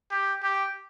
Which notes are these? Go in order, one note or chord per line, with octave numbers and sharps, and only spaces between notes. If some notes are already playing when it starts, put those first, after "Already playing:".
G4
G4